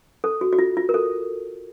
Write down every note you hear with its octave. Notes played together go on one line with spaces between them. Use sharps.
A4
F#4
F#4
F4
F4
A#4
A4